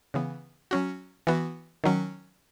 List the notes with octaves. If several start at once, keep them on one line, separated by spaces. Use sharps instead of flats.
C#3 E3 B3
F#3 C#4 F#4
E3 B3 F#4
D#3 F#3 C#4